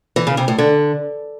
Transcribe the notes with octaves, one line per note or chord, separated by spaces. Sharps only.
E3
C#3
C3
A2
D3